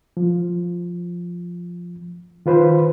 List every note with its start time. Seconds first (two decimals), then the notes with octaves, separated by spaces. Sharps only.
0.17 F3
2.46 D#3 F4 B4 C5